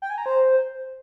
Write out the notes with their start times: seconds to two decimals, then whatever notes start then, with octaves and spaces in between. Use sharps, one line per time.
0.02 G5
0.10 G#5
0.18 A#5
0.26 C5